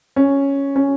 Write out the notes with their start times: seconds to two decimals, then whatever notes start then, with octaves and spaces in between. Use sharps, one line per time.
0.16 C#4
0.76 C#4